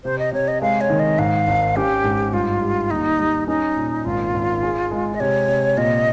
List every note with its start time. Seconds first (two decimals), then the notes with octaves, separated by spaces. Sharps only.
0.04 C3 C5
0.19 D#5
0.33 C3 C#5
0.48 D#5
0.62 G#3 F5
0.81 C#5
0.90 D#3
0.99 D#5
1.18 G#2 F5
1.47 G#1
1.76 C#4 G4
2.04 G#2
2.33 G2 F4
2.62 G3
2.91 D#2 D#4
3.19 G3
3.47 C#4 D#4
3.76 A#2
4.05 G#1 F4
4.34 G#1
4.63 G#4
4.91 G#3
5.14 D#5
5.20 C3 C#5
5.49 C3
5.77 A#2 D#5